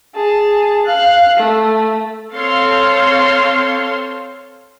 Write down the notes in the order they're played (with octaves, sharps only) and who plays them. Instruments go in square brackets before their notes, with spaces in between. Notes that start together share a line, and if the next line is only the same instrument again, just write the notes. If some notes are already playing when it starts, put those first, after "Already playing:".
[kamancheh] G#4 A5
F5 F#6
A3
[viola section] C4 A4 C5 C#5 F5 C6